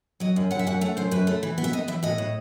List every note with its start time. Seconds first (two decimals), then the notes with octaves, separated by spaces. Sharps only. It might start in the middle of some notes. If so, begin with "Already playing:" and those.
0.20 F#3 D#5
0.36 F#2
0.51 F#2 F#5
0.59 E5
0.67 F#2 F#5
0.81 A3 F#5
0.97 F#2 C5
1.11 F#2 B4
1.27 A3
1.43 E3
1.58 B3
1.64 E5
1.73 B3 D#5
1.88 E3 E5
2.03 A2 D#5
2.18 A2